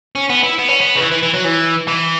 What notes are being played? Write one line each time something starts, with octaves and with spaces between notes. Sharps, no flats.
C#4
B3
E4
B3
C#4
B3
C#3
E3
E3
E3
F#3
E3
E3